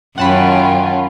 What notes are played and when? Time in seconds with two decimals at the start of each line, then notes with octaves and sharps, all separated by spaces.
0.18 F#2 D#3 C#4 F4 F#5 G5 A5 B5